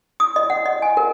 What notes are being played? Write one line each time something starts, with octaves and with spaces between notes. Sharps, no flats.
D#6
D#5
F#5
D#5
G#5
A#4